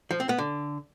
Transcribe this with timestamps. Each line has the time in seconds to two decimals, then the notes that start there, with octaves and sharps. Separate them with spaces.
0.11 F3
0.20 C4
0.29 B3
0.38 D3